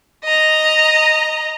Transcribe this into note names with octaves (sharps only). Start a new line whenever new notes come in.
D#5 A#5